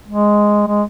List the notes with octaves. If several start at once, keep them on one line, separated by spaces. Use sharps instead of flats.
G#3
G#3